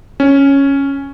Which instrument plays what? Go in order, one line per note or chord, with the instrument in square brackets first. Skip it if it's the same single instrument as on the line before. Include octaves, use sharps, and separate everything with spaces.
[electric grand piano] C#4